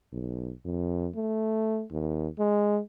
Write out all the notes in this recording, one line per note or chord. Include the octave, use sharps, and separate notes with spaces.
B1
F2
A3
D#2
G#3